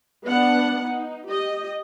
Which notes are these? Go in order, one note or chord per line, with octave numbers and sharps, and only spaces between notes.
B3 D4 F#5
D#4
G4 D#5